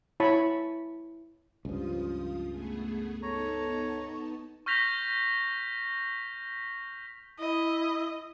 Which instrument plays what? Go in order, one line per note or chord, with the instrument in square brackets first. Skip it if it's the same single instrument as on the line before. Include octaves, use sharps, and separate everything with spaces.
[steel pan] E4 C#5 A5 B5 C#6
[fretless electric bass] C#2 G2 [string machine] F3 F4 D#6
[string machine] A3 B3 G#4
[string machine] B3 D#4 A5 [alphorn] A4 [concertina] C#5 A#5
[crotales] C#6 F6 G6 A#6 B6 F7
[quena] E4 [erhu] D#5